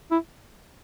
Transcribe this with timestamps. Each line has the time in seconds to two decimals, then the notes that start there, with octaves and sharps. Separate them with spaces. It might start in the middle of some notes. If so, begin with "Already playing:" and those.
0.11 E4